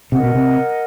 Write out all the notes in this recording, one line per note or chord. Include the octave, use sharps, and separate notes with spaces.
C3 A#4 D#5 F#5
B2
C3